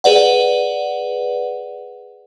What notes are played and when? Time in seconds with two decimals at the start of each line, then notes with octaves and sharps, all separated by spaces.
0.04 G#4 B4 D5 F#5